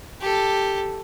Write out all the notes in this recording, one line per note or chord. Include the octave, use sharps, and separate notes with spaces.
G4 A4